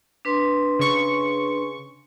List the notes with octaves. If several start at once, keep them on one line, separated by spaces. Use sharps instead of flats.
D4 B4 C6
C#3 C#6